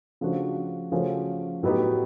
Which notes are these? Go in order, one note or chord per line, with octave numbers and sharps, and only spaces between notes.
C#3 F3 A3 D4 F#4
C#3 F3 A3 C#4 F#4
A2 F#3 B3 D#4 G4